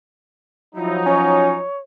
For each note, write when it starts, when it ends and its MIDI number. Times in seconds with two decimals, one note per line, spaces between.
0.75 1.60 53
0.75 1.60 54
0.75 1.60 63
0.75 0.97 64
1.06 1.54 61
1.06 1.78 73